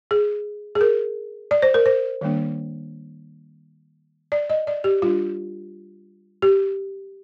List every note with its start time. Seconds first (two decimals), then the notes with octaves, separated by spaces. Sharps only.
0.11 G#4
0.75 G#4
0.81 A#4
1.51 D5
1.62 C5
1.74 A#4
1.86 C5
2.21 D#3 G3 A#3 D4
4.32 D5
4.50 D#5
4.67 D5
4.84 G4
5.02 G3 D4 F4
6.42 G4